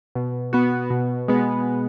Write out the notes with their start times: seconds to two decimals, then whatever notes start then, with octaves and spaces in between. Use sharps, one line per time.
0.15 B2
0.53 B3 F#4
0.90 B2
1.28 G#3 B3